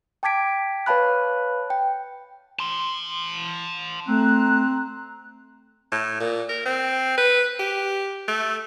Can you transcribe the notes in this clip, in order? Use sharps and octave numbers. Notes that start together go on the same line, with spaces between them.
G5 A5 D6 G#6 B6 D7
B4 C#5 F5 A5 B5 F#6
G5
A5 C6
A3 C4 A#5 F#6
A2
A#2
A#4
C4
B4
G4
A3